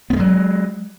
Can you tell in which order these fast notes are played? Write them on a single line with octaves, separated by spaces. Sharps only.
B3 A#3 G#3 F#3